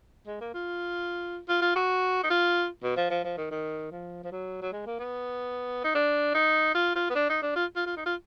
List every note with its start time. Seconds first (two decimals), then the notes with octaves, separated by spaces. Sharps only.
0.27 G#3
0.41 A#3
0.54 F4
1.48 F4
1.62 F4
1.75 F#4
2.23 D#4
2.30 F4
2.83 B2
2.97 F3
3.10 F3
3.24 F3
3.37 D#3
3.51 D#3
3.91 F3
4.24 F3
4.32 F#3
4.62 F#3
4.72 G#3
4.86 A#3
4.99 B3
5.84 D#4
5.95 D4
6.34 D#4
6.74 F4
6.95 F4
7.10 B3
7.15 D4
7.29 D#4
7.42 D4
7.55 F4
7.76 F4
7.86 F4
7.97 D#4
8.06 F4